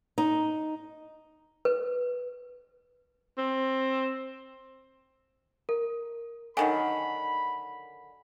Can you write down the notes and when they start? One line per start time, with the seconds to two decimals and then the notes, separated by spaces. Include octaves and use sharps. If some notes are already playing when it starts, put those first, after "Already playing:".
0.18 D#4
1.65 B4
3.38 C4
5.69 A#4
6.57 D3 D#3 F#3 G#5 B5